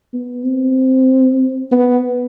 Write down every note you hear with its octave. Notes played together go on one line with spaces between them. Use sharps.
B3
C4
B3